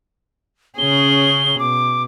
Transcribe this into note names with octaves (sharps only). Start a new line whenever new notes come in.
C#3 C#4 G#4 G7
B2 D6